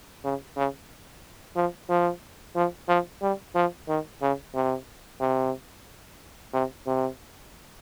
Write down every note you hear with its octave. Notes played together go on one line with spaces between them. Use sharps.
C#3
C#3
F3
F3
F3
F3
G3
F3
D#3
C#3
C3
C3
C3
C3